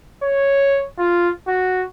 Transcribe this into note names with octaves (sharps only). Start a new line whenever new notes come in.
C#5
F4
F#4